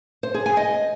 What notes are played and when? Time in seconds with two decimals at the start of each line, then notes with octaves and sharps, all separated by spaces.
0.23 C5
0.34 G#4
0.46 G#5
0.57 D#5